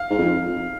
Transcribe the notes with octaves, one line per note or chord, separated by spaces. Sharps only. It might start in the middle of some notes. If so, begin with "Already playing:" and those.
Already playing: F5
G#2
F2